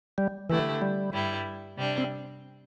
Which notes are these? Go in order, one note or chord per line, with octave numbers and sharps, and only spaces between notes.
G3
D3 E3 A3 E4 G4
G3
G2 G3 E4
C3 G3 D4
C4